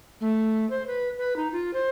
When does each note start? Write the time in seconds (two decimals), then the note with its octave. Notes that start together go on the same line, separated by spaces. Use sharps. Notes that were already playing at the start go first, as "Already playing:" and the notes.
0.20 A3
0.70 C5
0.87 B4
1.17 B4
1.36 D#4
1.52 F4
1.73 C5